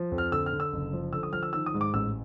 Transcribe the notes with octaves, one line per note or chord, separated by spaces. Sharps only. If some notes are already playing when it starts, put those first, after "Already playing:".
Already playing: F3
F2
F6
D3 E6
F6
D3
E6
F#1
F3
D3 E6
D#6
F3 F6
E6
D#3 E6
D#6
G#2
D6
A1 E6